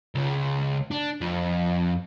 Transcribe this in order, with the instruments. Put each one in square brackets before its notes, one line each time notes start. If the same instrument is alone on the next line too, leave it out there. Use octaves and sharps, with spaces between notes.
[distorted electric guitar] C#2 C#3
D4
F2